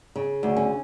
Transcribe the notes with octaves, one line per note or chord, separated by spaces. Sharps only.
C#3
D2
C#4